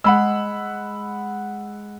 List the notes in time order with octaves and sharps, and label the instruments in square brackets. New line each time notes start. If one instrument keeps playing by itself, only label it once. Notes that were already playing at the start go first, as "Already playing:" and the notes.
[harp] G#3 [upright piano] F#5 B5 E6